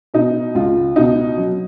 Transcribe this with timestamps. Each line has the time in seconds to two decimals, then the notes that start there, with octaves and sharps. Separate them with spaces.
0.14 B2 D#4
0.55 C#2 F4
0.96 B2 D#4
1.38 F#3